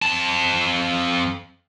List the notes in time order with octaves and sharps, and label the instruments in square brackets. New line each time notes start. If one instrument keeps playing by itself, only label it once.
[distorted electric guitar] F2 A5